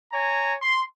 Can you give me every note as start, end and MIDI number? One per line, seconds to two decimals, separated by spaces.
0.13 0.55 73
0.13 0.55 80
0.13 0.55 82
0.62 0.83 84